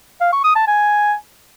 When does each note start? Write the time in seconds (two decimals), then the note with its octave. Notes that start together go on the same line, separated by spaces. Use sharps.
0.21 F5
0.32 C#6
0.44 D#6
0.56 A5
0.67 G#5